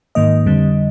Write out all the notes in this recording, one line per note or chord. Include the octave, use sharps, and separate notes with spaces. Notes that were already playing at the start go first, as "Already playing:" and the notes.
G#2 D#3 A#3 D#5
F2 D3 G3 C4